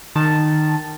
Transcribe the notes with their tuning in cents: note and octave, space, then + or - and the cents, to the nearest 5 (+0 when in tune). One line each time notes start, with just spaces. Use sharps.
D#3 -20 A5 +0